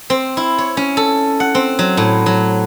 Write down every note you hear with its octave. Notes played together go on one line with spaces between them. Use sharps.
C4
E4
C#5
C#4
A4
F#5
C4
F#3
A2
F#3